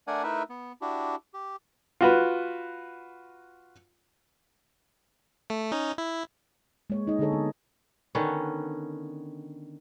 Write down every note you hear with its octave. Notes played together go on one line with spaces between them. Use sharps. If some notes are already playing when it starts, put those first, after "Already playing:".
A3 D4 A#4 D5 F#5 G#5
A3 D#4 E4 A#4 B4 E5
B3
D4 E4 F#4 G4
G4
F4 F#4 B4
A3
C#4 D#4
E4
G#3 A#3 C#5
D#4 G#4 D#5
D3 C4 D4 G#4 A4 C#5
B3
D3 D#3 B3 C#4